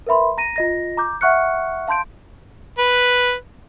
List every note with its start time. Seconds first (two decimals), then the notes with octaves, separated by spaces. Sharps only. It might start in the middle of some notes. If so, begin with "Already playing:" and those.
0.07 A#4 B4 E5 B5 C6
0.38 A#5 A#6 D#7
0.56 F4 D#5 A#6
0.97 A#5 D6 G6
1.21 E5 F#5 C#6 F6 F#6 C#7
1.88 F5 A5 C6 G6 D7
2.79 B4